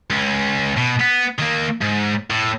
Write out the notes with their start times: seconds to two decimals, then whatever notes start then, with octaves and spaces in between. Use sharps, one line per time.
0.11 C#2 C#4
0.78 B2
1.01 B3
1.39 D#3 A#3
1.82 G#2
2.31 A2